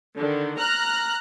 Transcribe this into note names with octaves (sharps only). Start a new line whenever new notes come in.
D3 D#3
A#5 F6 F#6